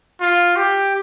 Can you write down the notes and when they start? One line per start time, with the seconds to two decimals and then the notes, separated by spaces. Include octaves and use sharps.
0.21 F4
0.56 G4